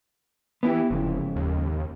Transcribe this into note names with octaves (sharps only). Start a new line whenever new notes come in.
E3 B3 E4 G4
F1 F2 G#2 C#3
D#2